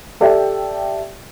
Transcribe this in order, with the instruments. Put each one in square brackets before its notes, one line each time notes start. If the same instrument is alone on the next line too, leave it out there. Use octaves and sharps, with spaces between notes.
[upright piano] G4 A4 D5 E5 G5